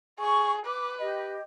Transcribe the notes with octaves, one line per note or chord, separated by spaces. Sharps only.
G#4 C#6
B4 D6
G4 D#5